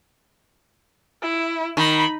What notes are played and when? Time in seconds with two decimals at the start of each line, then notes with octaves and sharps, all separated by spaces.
1.22 E4
1.77 D#3 B5